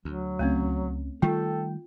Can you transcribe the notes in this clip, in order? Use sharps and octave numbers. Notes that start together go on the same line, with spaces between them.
D2 F#3
C#2 A3 C4 C#4 C#5
D#3 G3 A3 F4 A4 G5